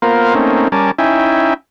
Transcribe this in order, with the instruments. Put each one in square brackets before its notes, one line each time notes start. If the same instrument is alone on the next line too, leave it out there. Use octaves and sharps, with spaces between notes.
[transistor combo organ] A#3 B3 F4 A#4 C5 F5
A3 A#3 C4 C#4 D#4
G3 C#4 A#4 G#5 A5 D6
C#4 D#4 E4 E5 G5 G#5